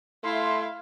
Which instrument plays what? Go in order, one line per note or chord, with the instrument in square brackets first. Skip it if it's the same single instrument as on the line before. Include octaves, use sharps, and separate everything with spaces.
[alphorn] A3 [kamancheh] E4 [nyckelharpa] F5 [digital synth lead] C6